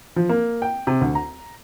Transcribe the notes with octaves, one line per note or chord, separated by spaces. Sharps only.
F3
A#3
G5
C3
D2
A#5